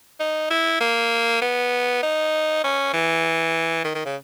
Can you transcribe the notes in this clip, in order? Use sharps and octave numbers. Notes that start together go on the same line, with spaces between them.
D#4
E4
A#3
B3
D#4
C#4
E3
D#3
D#3
C#3